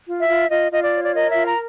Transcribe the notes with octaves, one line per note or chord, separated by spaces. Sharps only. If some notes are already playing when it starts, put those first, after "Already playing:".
F4
E5
F4
F4 D#5
F4 D#5
D5
C#5
D5
A#4 D#5
E5
F4
A#5